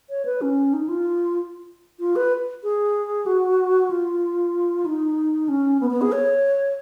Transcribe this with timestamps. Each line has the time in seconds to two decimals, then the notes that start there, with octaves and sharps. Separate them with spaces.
0.10 C#5
0.25 B4
0.41 C#4
0.73 D#4
0.88 F4
2.00 F4
2.16 B4
2.64 G#4
3.26 F#4
3.90 F4
4.85 D#4
5.49 C#4
5.80 B3
5.91 B3
6.02 G#4
6.12 C#5